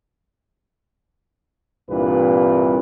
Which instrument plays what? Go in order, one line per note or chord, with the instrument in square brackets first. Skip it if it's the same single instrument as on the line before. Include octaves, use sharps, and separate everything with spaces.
[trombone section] C2 G2 A#2 E3 B4